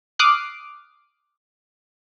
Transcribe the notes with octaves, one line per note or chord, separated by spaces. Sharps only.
D6 D#6 F6 F#6 C7